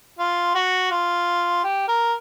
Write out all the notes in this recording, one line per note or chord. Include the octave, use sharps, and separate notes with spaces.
F4
F#4
F4
G4
A#4